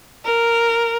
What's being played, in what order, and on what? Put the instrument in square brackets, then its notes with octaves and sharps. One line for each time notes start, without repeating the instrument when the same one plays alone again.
[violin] A#4